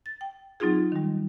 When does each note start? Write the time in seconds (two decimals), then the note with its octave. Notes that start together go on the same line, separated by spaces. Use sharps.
0.06 A6
0.21 G5
0.60 F#3 C4 D#4 F4 G#4
0.92 D#3 G3